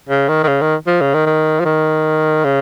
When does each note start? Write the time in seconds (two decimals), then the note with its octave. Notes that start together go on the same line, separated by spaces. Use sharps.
0.09 C#3
0.29 D#3
0.44 D#3
0.48 C#3
0.61 D#3
0.87 F3
1.01 C#3
1.14 D#3
1.26 D#3
1.60 F3
1.65 D#3
2.44 C#3